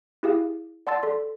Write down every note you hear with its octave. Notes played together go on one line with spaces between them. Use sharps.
E4 G4 G#4 F5
D5 F#5 A5 C6 E6 A6
A4 D5 C6